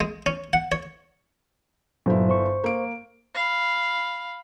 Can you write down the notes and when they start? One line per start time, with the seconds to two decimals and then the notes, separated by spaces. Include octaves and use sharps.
0.01 G#3
0.26 C#4
0.53 F#5
0.72 C#5
2.06 G1 A#2 F#3 E4 C5
2.29 C5 C#6
2.64 A#3 D7
3.35 F5 B5